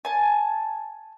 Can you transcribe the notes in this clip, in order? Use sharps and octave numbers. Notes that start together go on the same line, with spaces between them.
G#5 A5